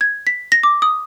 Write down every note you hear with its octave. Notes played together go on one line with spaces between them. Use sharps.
G#6
B6
A#6
D6
D#6